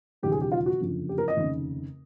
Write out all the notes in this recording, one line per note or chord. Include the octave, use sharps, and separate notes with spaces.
E1 D#2 C#3 F#3 G4
G#4
G4
F4
F#4
F#1 F2 D3 F3
G4
A#4
D#5
F1 D#2 C#3